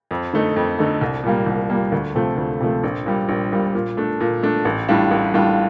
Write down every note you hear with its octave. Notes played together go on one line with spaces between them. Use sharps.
F2
D3 A3 D#4
F2
D3 A3 D#4
C2
A#2 G3 A#3
C2
A#2 G3 A#3
D2
C3 F3 A3
D2
C3 F3 A3
A#1
A#2 G3
A#1
A#2 G3
A#2
A3 D4
A#2
A3 D4
A1
A2 G3 D4 F4
A1
A2 G3 D4 F4